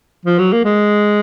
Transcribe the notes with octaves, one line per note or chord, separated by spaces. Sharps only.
F3
F#3
A#3
G#3